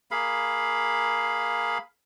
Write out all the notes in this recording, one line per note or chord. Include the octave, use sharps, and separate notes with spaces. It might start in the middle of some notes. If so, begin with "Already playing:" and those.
A#3 G#4 F5 B5